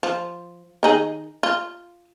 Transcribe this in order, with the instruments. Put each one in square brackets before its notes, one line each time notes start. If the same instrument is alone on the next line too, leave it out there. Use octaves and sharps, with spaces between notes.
[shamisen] F3
D#3 D#4 G#4
F4